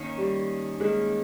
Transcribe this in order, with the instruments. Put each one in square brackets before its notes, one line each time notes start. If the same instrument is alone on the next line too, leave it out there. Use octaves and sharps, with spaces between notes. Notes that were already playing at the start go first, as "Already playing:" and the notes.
Already playing: [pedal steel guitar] D#3 A#3 C#4
[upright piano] G3
[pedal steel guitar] D#3 A#3 C#4 [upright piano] G#3